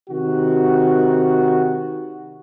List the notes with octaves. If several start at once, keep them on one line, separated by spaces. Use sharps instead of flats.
C3 D#3 F#4